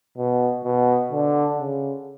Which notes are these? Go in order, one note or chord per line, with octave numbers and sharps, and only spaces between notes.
B2
B2
D3
C#3